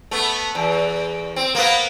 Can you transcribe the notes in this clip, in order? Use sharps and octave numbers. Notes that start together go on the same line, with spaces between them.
A3 B3
E2
C4
A#3 B3